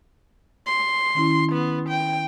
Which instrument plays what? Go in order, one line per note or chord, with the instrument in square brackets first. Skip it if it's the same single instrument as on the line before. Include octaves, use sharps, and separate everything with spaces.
[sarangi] C6
[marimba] D#3 C#4 E4
[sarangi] B3
G5